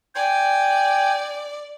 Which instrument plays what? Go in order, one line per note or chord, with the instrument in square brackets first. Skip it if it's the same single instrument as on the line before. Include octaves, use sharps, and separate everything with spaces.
[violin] D5 [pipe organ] G5 G#5